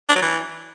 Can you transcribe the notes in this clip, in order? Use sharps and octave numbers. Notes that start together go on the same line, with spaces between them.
D4
F#3
E3